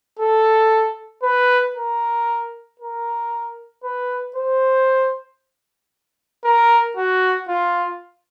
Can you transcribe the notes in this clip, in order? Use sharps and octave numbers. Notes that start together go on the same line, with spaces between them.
A4
B4
A#4
A#4
B4
C5
A#4
F#4
F4